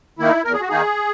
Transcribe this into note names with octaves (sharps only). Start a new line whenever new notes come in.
D#3 A#3 D#4 E4
E2 A#4
G#4
F#4
D#3 A#3 D#4 G#4